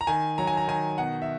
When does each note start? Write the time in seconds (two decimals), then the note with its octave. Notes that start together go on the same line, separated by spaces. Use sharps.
0.01 A#5
0.07 D#3 G#5
0.38 F#3 A#5
0.47 G#5
0.57 A#5
0.68 D#3 G#5
0.98 B2 F#5
1.22 E5